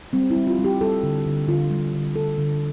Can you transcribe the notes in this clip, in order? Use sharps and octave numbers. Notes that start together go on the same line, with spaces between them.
G3 C4
E4
G3
F4
G3
G4
G3 A4
D3
D3
D3 F4
G3
D3
D3 A4
D3